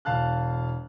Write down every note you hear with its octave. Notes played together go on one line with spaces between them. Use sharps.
E1 F5 A5 F#6